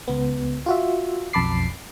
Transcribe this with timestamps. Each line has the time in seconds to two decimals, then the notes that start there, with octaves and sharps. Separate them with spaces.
0.08 C#2 B3
0.66 F4 F#4 E5
1.33 B1 F2 A5 B5 D6 C7